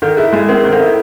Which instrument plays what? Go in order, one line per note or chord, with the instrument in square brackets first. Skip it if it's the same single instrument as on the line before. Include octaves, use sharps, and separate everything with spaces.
[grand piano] D#3 [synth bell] A4
[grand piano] E4 [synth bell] G#4
[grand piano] G#3 [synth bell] G#4
[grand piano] C4 [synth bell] A#4
[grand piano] D#3
[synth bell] A4
[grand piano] E4